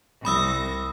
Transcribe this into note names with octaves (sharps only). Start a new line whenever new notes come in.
C2 B5 D#6 E6 A#6